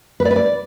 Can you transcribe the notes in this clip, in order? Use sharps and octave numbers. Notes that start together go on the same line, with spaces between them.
B4
D5
B4
D5